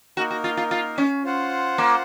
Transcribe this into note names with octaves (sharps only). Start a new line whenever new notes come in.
A#3 D#4 F#4 A#4
F#4
F4
F4
F4
C#4
F4 C5 F#5
A#3